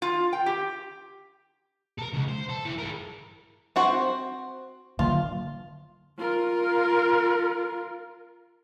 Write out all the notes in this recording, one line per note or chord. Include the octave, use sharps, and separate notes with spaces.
F4
G5
G4
A4 A#4
C#3 G#3
C5
A4
F3 E4
G#4 A#4
C4 F#4 C5
D3 F#3 A#3 F4
F4 A#4